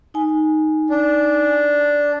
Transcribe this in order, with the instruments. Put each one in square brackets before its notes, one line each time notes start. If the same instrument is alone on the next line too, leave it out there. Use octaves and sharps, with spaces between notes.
[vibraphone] D#4 G#5
[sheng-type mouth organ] D4